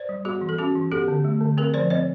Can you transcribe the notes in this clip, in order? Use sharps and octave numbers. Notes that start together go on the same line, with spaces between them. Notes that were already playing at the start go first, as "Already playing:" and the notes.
Already playing: C5 D5
G3
B3 F#4 G#4
E3
A4
C#4 F#4 G#4
E3
B3 G4 A4
D3
A3
D3
C4 G#4 A#4
F3 C5 D5
C4 C#5 D#5